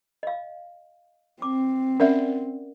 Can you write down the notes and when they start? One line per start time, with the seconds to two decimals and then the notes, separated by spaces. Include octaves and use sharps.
0.23 D#5 F5
1.42 C4 D6
2.00 C#4 A#4 D5 E5 F#5